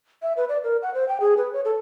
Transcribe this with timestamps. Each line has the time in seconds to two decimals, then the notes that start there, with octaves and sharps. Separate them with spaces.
0.22 E5
0.37 B4
0.49 D5
0.64 A#4
0.82 F#5
0.94 C5
1.08 G5
1.20 G#4
1.37 B4
1.53 C#5
1.65 A4